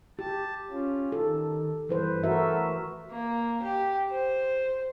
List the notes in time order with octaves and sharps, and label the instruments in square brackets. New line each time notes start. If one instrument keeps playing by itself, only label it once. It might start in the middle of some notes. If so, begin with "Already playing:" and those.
[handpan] G4 [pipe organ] A5
[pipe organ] C#4 F4
[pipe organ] D#3 [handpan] A4
[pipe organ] G2 [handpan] E3 B4 C5
[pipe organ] A3 A4 [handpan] F#4 A#4 E5
[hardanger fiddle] A#3
G4
C5